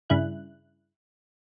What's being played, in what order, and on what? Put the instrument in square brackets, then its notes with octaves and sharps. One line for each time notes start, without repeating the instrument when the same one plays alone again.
[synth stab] G2 C#3 E4 F#6